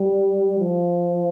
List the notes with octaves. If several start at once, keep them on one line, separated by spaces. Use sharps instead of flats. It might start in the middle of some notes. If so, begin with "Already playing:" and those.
Already playing: G3
F3